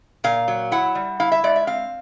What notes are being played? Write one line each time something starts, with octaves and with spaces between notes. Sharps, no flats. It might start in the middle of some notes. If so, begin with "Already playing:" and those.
A#2 F5
F#3
E4 F#5
G3
E4 F5
E5
G#3 D5
E5
C4 F5